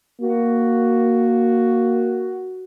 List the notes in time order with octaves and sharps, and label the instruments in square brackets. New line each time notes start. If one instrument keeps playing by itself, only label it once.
[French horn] A#3 [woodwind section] F#4